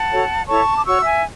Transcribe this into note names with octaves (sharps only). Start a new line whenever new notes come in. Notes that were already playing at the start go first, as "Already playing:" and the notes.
Already playing: F#5 A5
F#4 A4 C#5
E4 A4 C#5 A5 C#6
D6
F#4 C#5 C#6 E6
E5 G#5